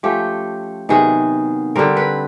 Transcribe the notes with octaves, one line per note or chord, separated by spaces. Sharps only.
F3 A3 C#4 G4
C3 D#3 F#3 B3 G#4
D3 G3 C4 A#4
B4